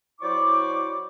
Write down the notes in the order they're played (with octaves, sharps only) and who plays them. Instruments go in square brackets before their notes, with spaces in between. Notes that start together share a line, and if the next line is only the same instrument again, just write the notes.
[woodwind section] F#3 E4 C5 D5 C#6 D6